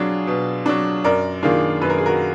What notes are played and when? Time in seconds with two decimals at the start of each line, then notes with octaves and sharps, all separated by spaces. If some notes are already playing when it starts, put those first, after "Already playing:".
Already playing: B2 F#3 D4 F4 G#4
0.27 B2
0.66 F#3 D4
1.04 F#2 A#4 D5
1.43 D#3 A#3 D4 F4 G#4
1.81 F#2 B4
1.90 A#4
1.98 G#4
2.06 F#4 A#4